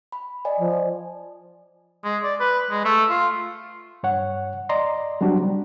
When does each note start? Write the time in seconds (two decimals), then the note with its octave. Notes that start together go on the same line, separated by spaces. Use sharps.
0.12 B5
0.45 D5 D#5 G#5
0.58 F3
2.04 G#3
2.23 D5
2.40 B4
2.71 G#3
2.85 A3
3.09 F4
4.03 G2 C#5 F#5
4.69 D5 D#5 A#5 C6
5.21 F#3 G3 C4 D4 F#4 G4
5.43 G3